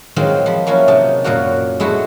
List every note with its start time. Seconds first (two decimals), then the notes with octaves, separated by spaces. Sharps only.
0.16 D#3 F#3 G#3 C4 F4
0.46 F3 B5
0.67 F#3 A#3 C#4 E4 F4
0.88 C3 D#4 A5
1.24 F#2 A#2 F#3 A#3 F#4
1.80 G#3 A3 E4 F#4